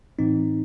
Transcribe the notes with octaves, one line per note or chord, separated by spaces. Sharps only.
A2 E3 C4 D#4